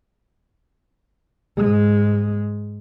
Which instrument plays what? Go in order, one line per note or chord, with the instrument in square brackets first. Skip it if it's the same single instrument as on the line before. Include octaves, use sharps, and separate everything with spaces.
[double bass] G#2 G#3